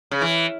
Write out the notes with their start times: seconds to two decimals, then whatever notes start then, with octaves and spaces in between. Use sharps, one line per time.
0.11 C#3
0.21 E3